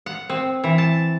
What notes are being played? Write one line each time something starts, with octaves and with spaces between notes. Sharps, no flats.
F#5
C4
E3
A5